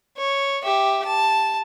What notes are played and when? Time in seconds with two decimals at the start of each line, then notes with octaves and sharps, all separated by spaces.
0.17 C#5
0.64 G4 E5
1.05 A5